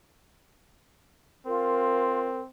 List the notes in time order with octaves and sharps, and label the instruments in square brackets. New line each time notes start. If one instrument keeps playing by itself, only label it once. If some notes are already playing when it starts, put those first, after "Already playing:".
[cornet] C4 [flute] F4 [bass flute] A#4